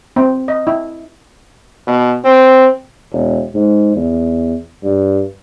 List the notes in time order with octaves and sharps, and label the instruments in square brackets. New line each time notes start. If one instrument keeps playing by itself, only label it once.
[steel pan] C4
D#5
E4
[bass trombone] B2
C4
[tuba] E1
G#2
E2
G2